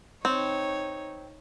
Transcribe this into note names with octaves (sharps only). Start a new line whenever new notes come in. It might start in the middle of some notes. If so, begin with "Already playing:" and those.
C4 D#4 C#5